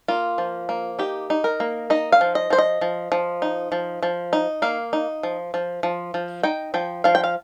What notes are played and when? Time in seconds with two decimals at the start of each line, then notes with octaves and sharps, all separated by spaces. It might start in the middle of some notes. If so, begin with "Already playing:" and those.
0.08 A#3 F4
0.38 F3
0.69 A#3
0.99 D#4 G4
1.30 D#4
1.44 A#4
1.60 A#3
1.90 D#4 D#5
2.12 F5
2.21 F3
2.35 D#5
2.50 F3 C5
2.58 D#5
2.81 F3
3.12 F3
3.42 D#4
3.72 F3
4.03 F3
4.33 D#4
4.62 A#3 F5
4.93 D#4
5.23 F3
5.54 F3
5.83 F3
6.14 F3
6.43 D#4 G5
6.74 F3 G5
7.04 F3 F5
7.15 G5
7.24 F5